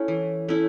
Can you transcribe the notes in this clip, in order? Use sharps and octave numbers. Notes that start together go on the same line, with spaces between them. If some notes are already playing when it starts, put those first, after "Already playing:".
Already playing: A3 C#4 E4
E3
A3 C#4 E4